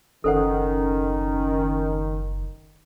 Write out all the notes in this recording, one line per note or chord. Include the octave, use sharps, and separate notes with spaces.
F#1 D#3 C#4 A4 C5 F#5